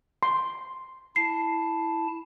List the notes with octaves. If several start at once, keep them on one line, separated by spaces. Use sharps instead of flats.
C6
E4 A5 C7